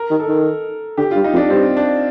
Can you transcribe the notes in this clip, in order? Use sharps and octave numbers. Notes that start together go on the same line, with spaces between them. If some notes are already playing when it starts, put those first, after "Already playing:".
Already playing: A#4
D#3
A4
D#3
D3 G4
G2 F4
D#4
F2
D4
G2 C4
D4